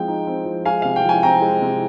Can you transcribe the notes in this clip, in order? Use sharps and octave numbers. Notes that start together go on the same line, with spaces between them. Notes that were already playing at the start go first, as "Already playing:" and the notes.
Already playing: F3 G#3 C4 G5
D#4
C4
F3
G#3 F5 G#5
C3 F5
G5
F3 G#5
C4 G5 A#5
G#3
C3